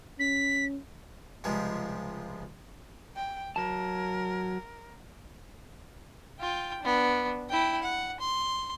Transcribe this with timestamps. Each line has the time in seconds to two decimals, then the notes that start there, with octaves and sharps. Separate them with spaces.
0.19 C#4 B6
1.44 C#2 C3 F3 G3 G#3
3.16 G5
3.56 F#3 A#4 A5
6.39 F4 G5
6.83 B3 D4
7.50 E4 G5
7.82 F#5
8.20 C6